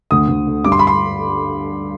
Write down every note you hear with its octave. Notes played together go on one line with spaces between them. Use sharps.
D2 D#6
D2
D3
G2 D6
C6
B5
C6